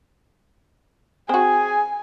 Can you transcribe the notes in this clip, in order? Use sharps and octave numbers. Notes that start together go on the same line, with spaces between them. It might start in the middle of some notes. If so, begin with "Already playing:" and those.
C4 F#4 G#4 G#5